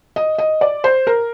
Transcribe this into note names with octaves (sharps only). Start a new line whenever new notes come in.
D#5
D#5
D5
C5
A#4